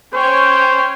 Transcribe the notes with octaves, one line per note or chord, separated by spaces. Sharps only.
C#4 C5 C#5 G5